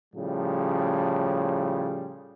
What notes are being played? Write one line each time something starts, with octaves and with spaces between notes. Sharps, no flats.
A2 C#3 F3 G3